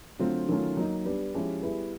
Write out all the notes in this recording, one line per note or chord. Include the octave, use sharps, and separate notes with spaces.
D3 F#3 A3 C4 F4
D#3 F#3 A3 C#4 F4
F#3 A#3 D#4
G3 B3 D4
F3 G#3 C#4 E4 G4
G3 B3 E4 G#4